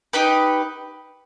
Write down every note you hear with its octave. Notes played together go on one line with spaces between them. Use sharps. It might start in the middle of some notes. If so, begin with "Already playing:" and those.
D#4 G4 B4